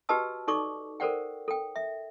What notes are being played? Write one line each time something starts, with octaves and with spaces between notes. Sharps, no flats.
F#4 G4 B4 D#5 A5 E6
D#4 A4 D5 C#6 D6
A4 A#4 C5 D5 F#5 G5
A4 G5
E5